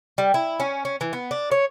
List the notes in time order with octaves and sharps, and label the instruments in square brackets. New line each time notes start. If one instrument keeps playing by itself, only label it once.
[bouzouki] G3
E4
C#4
C#4
E3
B3
D4
C#5